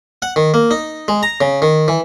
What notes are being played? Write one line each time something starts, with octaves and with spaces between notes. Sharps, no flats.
F#5
D#3
A#3
D#4
G#3
A#5
C#3
D#3
E3